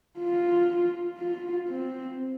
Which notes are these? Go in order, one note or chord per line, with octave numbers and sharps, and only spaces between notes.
F4
F4
C4